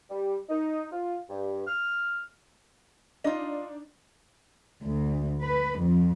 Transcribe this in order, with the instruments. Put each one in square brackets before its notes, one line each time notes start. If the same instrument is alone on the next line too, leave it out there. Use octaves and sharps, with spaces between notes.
[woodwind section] G3
D#4
F4
G2
F6
[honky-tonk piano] D4 D#4 [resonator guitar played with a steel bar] F4 D#5
[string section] D2
B4
F2